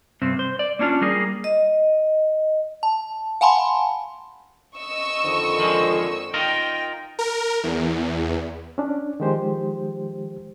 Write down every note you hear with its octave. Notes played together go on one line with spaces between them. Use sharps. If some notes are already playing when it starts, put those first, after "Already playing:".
G2 C3 C4
C5
D5
A#3 C#4 D4 F4
G3 A#3 G#4
D#5
A5
F5 F#5 G#5 A5 B5 C6
D#5 C#6 E6
F2 D3 D#3
F3 G#3
D#4 F4 A#4 G5
A#4
E2
C#4 D4
D#3 F3 G#3 G4 C5